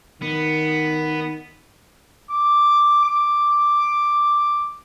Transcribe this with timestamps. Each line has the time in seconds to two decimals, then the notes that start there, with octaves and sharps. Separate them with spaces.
0.22 D#3 B3
2.31 D6
3.05 D6